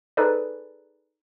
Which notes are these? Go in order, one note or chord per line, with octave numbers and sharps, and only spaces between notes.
D#4 G#4 A4 B4 C5 D5